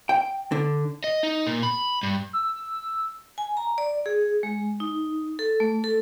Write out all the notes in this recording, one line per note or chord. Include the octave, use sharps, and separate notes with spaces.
G5
D3
D#5
D#4
A#2
B5
G2
E6
G#5
A#5
D5
G#4
G#3
D#4
A4
A3
A4